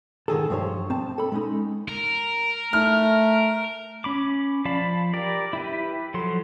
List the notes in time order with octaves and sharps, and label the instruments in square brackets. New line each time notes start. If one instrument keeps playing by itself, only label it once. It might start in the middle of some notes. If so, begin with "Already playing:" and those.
[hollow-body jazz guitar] G#2 D#3 G#4 A4
G2 F3 C5 C#5
C4 A5
A4 B5
G#3 C#4 D#4
[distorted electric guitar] A#4
[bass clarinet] A3 [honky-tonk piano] F6
[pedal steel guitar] C#4 B5 D6
F3 D5 F5 A5 B5
G4 A#4 D5
E4 G4 B4
F3 F#3 A4 C6